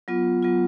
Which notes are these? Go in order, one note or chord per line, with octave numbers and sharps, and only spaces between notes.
F#3 B3 F4
F#3 B3 F4